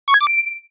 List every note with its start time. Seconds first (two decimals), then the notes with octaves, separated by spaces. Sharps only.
0.08 C#6
0.14 G#6
0.21 D6
0.27 D7